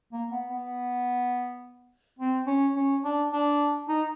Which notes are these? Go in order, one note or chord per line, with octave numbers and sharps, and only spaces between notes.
A#3
B3
B3
C4
C#4
C#4
D4
D4
D#4